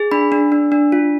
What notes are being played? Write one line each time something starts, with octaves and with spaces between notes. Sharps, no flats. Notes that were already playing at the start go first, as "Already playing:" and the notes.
Already playing: G#4
D4 B5
D4
D4
D4
F4